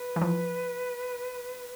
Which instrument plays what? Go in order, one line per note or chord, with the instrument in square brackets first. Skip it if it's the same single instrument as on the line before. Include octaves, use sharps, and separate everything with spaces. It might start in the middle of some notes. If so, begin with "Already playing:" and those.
Already playing: [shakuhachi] B4
[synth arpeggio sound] E3
F3